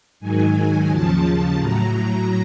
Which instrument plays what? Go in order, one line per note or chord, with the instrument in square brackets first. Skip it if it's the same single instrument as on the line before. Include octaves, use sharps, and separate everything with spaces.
[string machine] G#2 D#3 F#3 G#5
D#2 C#3 F3 A5
A2 F#3 A#5